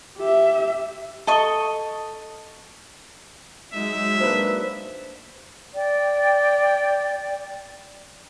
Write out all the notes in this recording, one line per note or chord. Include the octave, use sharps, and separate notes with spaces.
G4 E5
A4 D#5 C#6
F#3 G#3 D#4 E5
A#3 D4 B4 C5
D5 G5